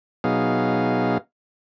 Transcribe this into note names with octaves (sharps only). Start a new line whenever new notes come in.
B2 F#3 B3 D#4 G#4 F5